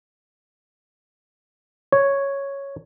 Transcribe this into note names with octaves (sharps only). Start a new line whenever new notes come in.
C#5